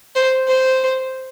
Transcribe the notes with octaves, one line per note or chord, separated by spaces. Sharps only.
C5
C5